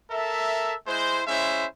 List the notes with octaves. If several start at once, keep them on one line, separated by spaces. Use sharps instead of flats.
A4 A#4 E5
G#3 E4 C5
G#3 C#4 E4 C5 E5